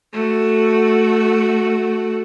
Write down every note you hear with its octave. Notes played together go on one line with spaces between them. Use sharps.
A3 F#4